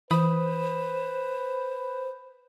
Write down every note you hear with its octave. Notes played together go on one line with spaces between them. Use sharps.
E3 B4 C5 B5 D#6